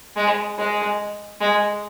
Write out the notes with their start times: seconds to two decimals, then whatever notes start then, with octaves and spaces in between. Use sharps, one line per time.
0.16 G#3
0.58 G#3
1.41 G#3